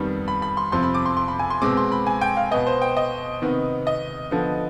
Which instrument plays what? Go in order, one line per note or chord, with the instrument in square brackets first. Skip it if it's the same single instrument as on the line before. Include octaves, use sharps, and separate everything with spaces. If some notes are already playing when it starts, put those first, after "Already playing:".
Already playing: [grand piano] F2 D#3 G3 B3
B5
B5
C6
F2 C3 F3 C4 C6
B5
D6
C6
C6
B5
G#5
C6
B2 G#3 C4 D6
C6
B5
G#5
G5
F5
B2 B3 D#5
C5
G5
D#5
C3 D#3 B3
D#5
D3 F3 B3